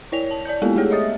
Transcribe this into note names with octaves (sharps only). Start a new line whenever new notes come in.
E4 C#5 D5 F7
A5
D5 A5 G6
G#3 A#3 B3 E4 G4 A4
G#3 A3 G4 G#4 C#5
D#5 E5 D#6 A6